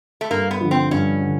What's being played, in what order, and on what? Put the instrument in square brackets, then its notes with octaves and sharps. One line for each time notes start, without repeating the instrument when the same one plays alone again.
[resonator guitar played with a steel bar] A3
[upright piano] G2 [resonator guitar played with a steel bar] A#3
[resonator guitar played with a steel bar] B3
[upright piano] D3 F3
[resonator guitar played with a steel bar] C4
[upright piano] G2 [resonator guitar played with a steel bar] C#4
[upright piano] D3